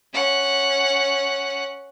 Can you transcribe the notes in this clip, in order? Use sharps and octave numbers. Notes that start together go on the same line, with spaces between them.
C#4 F#5